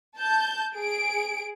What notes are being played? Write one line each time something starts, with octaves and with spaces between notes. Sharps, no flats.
A5 G6
G#4 D7